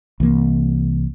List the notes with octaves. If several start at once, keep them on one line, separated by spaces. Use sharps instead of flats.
C2 E3 A#3